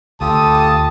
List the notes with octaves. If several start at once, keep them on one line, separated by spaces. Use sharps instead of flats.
D2 F4 G4 A4 A5 D#6